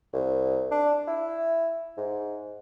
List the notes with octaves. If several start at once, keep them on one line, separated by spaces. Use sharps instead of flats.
C2
D4
E4
G#2